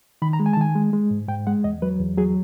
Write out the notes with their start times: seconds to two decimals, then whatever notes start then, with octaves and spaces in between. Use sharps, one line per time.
0.22 D#3 B5
0.33 A#5
0.40 G#3
0.46 G#5
0.53 A5
0.57 D#3 G#5
0.75 G#3
0.93 G#3
1.11 G#2
1.28 G#2 G5
1.47 G#3 F#5
1.64 E2 D#5
1.82 F#3 B4
1.99 E2
2.18 F#3 G#4